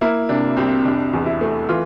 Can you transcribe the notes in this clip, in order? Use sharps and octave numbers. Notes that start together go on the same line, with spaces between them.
A#3 E4
C3 D4
C2 C4
F1 D4
E2
E4
A3
E3 F4